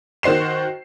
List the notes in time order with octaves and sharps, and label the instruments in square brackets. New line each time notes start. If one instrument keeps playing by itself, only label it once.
[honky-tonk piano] D#3 F#4 C5 C7 E7